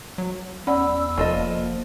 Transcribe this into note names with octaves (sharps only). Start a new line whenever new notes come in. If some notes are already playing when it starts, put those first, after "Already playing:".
F#3
E2 C#4 D5 F#5 B5 E6
F1 F3 A#3 F4 A4 D#5